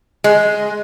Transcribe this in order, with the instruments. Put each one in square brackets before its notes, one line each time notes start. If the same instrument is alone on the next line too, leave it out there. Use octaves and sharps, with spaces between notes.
[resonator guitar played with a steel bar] G#3